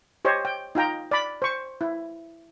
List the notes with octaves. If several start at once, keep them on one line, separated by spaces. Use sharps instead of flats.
G4 C5 C#5 D#5
G5
D#4 F4 G5 A#5
D5 B5
C5 C#6
E4